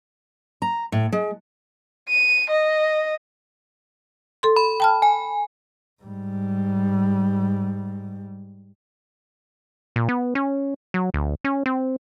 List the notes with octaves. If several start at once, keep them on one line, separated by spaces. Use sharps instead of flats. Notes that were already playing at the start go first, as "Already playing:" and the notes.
A#5
A2
G#3
D#7
D#5
A4 C6
B5
G5 A5 F6
G#5
G#2 G3
A#2
B3
C#4
F#3
D2
C#4
C4